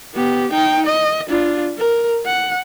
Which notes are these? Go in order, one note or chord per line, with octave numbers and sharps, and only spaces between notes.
B3 G4
D#4 G5
D#5
D4 F4
A#4
F#5